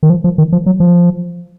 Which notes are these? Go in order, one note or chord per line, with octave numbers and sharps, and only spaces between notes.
D#3
F3
F3
D#3
F3
F#3
F3